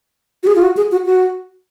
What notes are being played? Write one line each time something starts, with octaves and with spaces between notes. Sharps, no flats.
F#4
G#4
F4
F#4
G#4
F#4
F#4